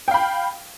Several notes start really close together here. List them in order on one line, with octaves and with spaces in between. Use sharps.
G5 F5 B5